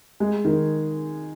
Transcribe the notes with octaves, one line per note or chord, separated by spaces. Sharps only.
G#3
D#3